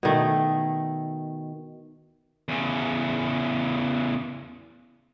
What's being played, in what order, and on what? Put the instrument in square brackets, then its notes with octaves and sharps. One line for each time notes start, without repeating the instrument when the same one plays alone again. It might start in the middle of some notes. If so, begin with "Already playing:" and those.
[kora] B2 D#3 A3
[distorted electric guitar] E2 C#3